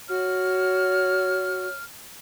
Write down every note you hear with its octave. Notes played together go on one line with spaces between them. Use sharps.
F#4 C#5 F6